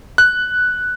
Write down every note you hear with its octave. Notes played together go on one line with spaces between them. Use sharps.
F#6